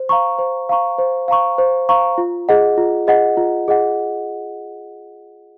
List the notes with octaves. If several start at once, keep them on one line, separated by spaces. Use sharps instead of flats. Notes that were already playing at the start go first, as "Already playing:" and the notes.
Already playing: C5
F5 A#5 C#6
C5
F5 A#5 C#6
C5
F5 A#5 C#6
C5
F5 A#5 C#6
F4
G#4 D#5 F#5
F4
G#4 D#5 F#5
F4
G#4 D#5 F#5